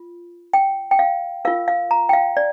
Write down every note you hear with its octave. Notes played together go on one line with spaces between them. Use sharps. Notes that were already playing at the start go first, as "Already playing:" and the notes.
Already playing: F4
G5
G5
F5
F4 A#4 F5
F5
A#5
G5
F5
D5